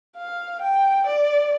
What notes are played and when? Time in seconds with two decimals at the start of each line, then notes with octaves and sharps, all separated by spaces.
0.16 F5
0.61 G5
1.07 D5